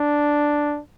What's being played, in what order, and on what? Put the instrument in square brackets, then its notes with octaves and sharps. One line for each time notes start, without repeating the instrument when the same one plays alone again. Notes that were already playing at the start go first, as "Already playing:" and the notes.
Already playing: [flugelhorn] D4